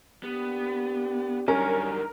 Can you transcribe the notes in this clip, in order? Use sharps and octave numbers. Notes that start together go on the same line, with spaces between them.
A#3 B3 D4 G4
G2 D3 D#3 F#3 G3 C#4 A#4